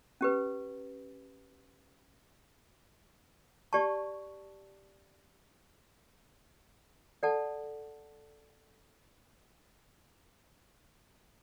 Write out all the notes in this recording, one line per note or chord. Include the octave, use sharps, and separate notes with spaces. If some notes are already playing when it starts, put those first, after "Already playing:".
C#4 G4 B4
G4 D5 A5 C#6
A4 D5 F#5 A5